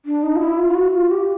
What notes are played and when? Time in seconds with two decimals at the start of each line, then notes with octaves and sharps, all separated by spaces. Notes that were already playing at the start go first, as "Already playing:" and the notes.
0.05 D4
0.23 D#4
0.36 F4
0.40 E4
0.58 F4
0.69 F4
0.75 F#4
0.93 F4
1.11 G4